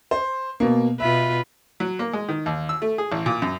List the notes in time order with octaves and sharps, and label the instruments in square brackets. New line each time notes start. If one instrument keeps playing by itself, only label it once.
[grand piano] C5
B2 A#3
[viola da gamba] B2 F4 B4 [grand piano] E5
[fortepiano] F#3
A#3
G#3
D#3
D#2
E6
A3
G#4
A1
A#2
F#2